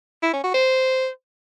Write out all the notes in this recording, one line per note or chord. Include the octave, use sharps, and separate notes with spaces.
E4
C#4
F#4
C5